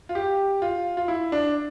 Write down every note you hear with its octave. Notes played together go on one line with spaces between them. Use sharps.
F4
G4
F4
F4
E4
D4